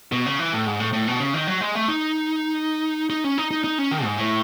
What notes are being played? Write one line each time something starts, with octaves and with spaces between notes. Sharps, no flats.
B2
C#3
E3
A2
G#2
A2
A2
B2
C#3
D#3
F#3
G#3
A3
D#4
D#4
C#4
D#4
D#4
D#4
C#4
D#3
G#2
A2